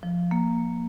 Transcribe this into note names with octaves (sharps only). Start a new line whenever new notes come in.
F3
A#3